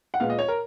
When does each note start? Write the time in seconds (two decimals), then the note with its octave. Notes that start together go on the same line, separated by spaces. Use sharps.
0.14 F#5
0.20 A#2 G#3 B3 F5
0.30 D#5
0.39 C#5
0.48 A#4